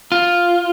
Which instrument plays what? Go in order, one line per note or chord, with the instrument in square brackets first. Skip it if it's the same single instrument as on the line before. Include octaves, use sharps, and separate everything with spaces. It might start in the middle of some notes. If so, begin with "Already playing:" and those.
[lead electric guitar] F4